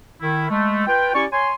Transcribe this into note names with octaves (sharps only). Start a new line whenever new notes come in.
D#3 E4
G#3 A3
F4 B4 G5
C#4 E4 G4 D5 C#6
C#5 G#5 C6